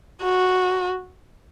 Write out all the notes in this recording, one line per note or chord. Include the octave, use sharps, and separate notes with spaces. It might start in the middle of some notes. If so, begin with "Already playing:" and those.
F#4